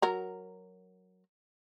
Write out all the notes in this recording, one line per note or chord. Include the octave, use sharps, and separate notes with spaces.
F#3 A#4 A#5